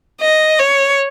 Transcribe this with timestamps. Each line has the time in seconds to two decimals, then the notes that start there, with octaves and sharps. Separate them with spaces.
0.21 D#5
0.59 C#5